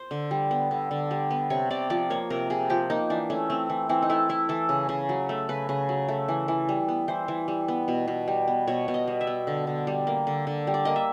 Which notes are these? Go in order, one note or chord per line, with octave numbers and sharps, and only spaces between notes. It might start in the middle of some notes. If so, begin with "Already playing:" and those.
Already playing: C5
D3
G3
B3
D3
D3
G3
B3
C3 C#5
C3 D5
F3 D5
A#3 C#5
C3 A#4
C3 G#4
F3 G4
A#3 D#4
E3 D4
A3 C#4
A3 C4
E3
E3 C4
D#4
A3 E4
A3 E4
E3 A4
C#3
C#3
F#3
A3
C#3 B4
C#3
F#3
A3
E3
E3
G3
B3
E3 C5
E3
G3
B3
B2
B2
G3
B3
B2 C#5
B2
D#5
G3
E5
B3
D3
D3
G3
A#3
D3
D3
G3
D5
A#3 D#5
E5